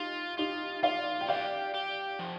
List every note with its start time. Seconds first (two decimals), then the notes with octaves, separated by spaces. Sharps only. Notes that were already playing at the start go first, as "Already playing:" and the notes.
Already playing: D#4 F4 G4
0.38 D#4 F4 G4
0.83 F4 D5 F5
1.21 G5
1.29 G4 D5 F5
1.74 G4
2.19 F3